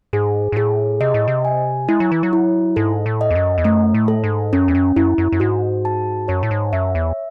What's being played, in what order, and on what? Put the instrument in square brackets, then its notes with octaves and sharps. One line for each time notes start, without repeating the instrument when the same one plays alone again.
[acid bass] G#2 [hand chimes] G#4
[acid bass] G#2
[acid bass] A2 [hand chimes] G#4
[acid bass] C3 [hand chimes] D#5
[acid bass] A2
C3
[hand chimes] G#5
[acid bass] G#3 [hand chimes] E4
[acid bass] F#3
E3
F#3
[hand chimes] E4
[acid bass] G#2 [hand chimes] A4
[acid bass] A2
[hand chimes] D#5
[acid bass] E2
F#2
E2
[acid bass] F#2 [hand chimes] A3
[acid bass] A2
[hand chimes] A4
[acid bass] G#2
[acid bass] F#2 [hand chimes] C#4
[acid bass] E2
F#2
[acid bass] F#2 [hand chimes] E4
[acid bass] F#2
F#2
[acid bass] G#2 [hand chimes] F#4
[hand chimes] A5
[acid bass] F#2 [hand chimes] C#5
[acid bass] A2
G#2
[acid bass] F#2 [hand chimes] E5
[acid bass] E2